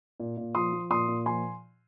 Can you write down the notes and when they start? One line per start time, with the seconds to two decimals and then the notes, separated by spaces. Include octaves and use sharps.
0.20 A#2
0.37 A#2
0.55 F3 C6 D#6
0.73 F3
0.90 A#2 C6 D#6
1.08 A#2
1.26 F3 G#5 C6